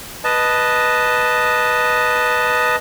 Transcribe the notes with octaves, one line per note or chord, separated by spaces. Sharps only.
B4 D#5 A5